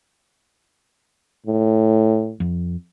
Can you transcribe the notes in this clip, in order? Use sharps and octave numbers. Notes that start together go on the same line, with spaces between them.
A2
F2